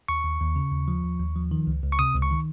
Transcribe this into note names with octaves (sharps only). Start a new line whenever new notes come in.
D#2 C#6
D#2
D#2
C#3
D#2
F3
D#2
D#2
F3
D#3
C#2
C#2
C#6
C3 D#6
C#2
C#6
D#3